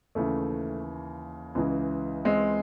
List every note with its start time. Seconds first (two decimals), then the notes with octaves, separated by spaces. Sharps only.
0.15 D#2 C#3 E3 A3
1.55 C#2 C#3 E3
2.25 G#3 C4